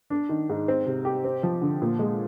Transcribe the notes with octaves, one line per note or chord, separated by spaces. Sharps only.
D4
D#3
G#2
C4
C3
G4
C4
F3
D3
A#2
G#3